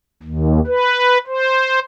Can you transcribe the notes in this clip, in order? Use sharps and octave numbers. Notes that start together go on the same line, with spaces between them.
D#2
B4
C5